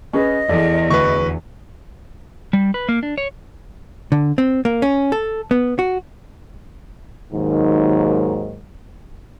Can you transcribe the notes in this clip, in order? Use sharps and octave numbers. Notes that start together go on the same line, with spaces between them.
C#4 G#4 B4 D#5
E2 A4 D5
D2 B4 C#6
G3
B4
A#3
D4
C#5
D3
C4
A#3
C#4
A4
B3
F#4
D#2 G#2 D#3 F#3